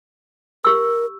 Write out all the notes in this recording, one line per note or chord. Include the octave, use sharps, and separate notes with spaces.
G4 A#4 E6